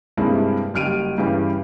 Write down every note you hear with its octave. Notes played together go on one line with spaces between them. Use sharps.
G2 C3 G#3 A#3 D4 E4
F#1 G3 F6 D7 D#7
G2 C#3 E3 C#4 G4